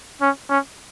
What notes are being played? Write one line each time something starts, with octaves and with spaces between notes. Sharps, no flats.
C#4
C#4